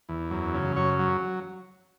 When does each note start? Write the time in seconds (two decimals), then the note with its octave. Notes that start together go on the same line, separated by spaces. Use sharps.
0.09 E2
0.31 F#2
0.54 C#3
0.76 F#2 C#5
0.99 F#3